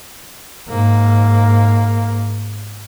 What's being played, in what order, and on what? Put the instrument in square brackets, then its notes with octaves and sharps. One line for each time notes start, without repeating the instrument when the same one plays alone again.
[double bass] G#2 A#3